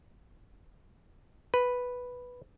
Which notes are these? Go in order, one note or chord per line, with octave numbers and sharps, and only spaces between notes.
B4